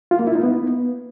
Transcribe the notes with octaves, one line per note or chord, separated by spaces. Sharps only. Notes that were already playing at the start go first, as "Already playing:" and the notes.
F4
A#3
E4
D#4
B3